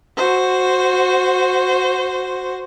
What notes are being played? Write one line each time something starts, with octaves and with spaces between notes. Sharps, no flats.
F#4 C5